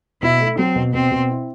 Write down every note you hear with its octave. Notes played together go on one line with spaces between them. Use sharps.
B2 E4
A3
F#3 C4
B2
B2 C4
B2
E4